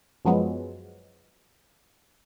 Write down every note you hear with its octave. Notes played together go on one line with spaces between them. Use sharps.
F#2 F3 F#3 G#3 B3